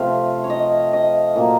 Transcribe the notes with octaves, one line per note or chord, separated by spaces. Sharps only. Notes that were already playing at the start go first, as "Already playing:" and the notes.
Already playing: C3 F3 A3 F5
C#5
D#5
D#5
A#2 F#3 A#3